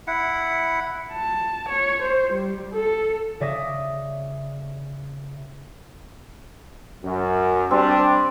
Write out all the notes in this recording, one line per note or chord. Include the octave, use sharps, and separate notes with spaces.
E4 F#5
A5
C#5
C5
G3
A4
C#3 D5 E5 D6 D#6 A#6
F#2
G3 C4 D4